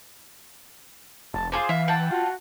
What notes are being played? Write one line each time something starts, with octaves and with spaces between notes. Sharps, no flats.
F1 A5
F4 G#4 C5 D6
E3 E5 F5
F#5 G5 A5
F4 F#4